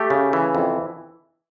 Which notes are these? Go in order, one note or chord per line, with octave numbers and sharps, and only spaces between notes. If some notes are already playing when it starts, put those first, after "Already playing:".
Already playing: A3 G4
C#3
E3
F2